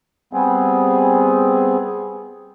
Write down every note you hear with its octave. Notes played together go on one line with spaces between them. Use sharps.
G3 B3 C4 G#4